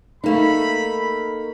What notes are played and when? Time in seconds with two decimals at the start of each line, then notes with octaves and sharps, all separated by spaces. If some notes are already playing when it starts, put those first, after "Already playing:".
0.24 A3 A#3 D#4 B5